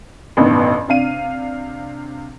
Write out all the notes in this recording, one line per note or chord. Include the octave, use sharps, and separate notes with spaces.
A1 G2 B2 D#3
C3 D4 F5 D#7